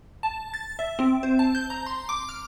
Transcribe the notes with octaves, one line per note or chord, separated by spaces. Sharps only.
A5
A6
E5
C4
C5
A5
G6
A#5
C6
D6
F6